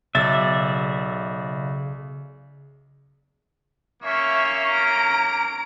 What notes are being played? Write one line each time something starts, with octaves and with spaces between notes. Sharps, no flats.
B1 C#3 D5 E5 A6
A#3 C#4 E5 C#6
A#5 D7